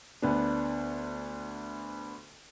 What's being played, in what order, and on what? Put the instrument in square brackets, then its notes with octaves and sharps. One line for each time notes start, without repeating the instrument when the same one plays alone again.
[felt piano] D2 B3 D4